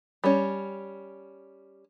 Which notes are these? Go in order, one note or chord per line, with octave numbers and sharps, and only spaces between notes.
G3 C#4